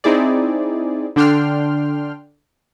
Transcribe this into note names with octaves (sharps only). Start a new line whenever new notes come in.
C4 D#4 E4 G#4 D5
D3 D4 G5 C6 F6